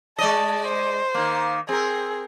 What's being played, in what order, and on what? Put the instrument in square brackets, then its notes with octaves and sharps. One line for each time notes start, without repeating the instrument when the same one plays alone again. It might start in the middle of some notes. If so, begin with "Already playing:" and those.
[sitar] G#3 D5 D#5 [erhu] A5
[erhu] C5
[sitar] D#3 A#3
[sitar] C4 A#4 [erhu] G#4